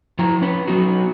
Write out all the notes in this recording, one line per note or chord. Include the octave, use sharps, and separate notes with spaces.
F3 E4 A#5
C#4 B4
F#3 B3 D#4 F#4